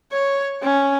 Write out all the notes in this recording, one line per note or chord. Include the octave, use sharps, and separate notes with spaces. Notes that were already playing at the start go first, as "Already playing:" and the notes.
C#5
C#4